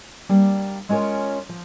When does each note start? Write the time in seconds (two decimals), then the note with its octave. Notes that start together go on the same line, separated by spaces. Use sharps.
0.29 G3 A#3 D4
0.89 G#3 C#4 F4 A#4 C#5
1.49 F3